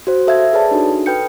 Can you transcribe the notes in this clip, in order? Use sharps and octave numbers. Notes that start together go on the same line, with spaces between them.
F#4 C5
A4 E5 F5 G#6
G#4 B4 C#5 D5 A5
D4 D#4 F#4 A4
A4 B4 G5 G6 C#7